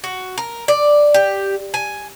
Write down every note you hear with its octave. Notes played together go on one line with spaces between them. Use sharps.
F#4
A#4
D5
G4
G#5